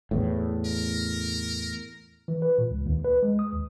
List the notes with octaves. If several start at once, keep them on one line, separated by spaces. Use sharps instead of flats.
E2 A2
A#4
E3
B4
A#2
C#2
D#2
B4
G#3
D#6
D#2